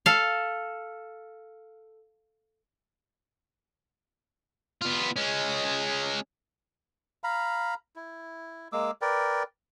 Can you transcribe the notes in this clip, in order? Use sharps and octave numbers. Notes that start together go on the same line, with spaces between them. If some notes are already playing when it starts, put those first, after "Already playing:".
A4 F5
B3 F4
G#3 C#4
F5 A#5 B5
E4
G#3 A#3 D6 E6
A#4 B4 D5 G5